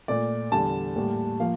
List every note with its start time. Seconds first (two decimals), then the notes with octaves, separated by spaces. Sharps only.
0.08 A#2 A3 D5
0.51 E2 D3 G3 A5
0.96 A2 G3 A#3
1.40 F3 A#3 F5